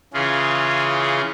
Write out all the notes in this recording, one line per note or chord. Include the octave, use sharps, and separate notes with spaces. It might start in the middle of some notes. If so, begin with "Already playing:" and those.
C#3 E3 C#4 F4 G#4